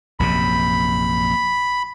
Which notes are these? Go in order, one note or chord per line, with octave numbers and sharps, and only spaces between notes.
A#1 F#2 C3 B5